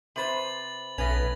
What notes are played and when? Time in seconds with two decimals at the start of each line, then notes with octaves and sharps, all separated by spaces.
0.16 C3 B4 C5 A6 F#7
0.98 B1 A3 B3 C#4 B4 A#6 F7